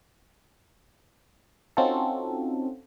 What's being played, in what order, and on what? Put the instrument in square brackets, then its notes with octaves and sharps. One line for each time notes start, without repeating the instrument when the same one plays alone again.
[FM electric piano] C4 C#4 D#4 F4 F#4 A4